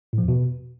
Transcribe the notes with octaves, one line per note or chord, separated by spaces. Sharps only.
A2
F3
E2
B2